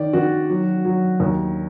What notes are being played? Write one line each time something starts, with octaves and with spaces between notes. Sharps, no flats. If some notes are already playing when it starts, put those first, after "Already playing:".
Already playing: D#3 D5
D#3 F#4
F#3
F#3
D#2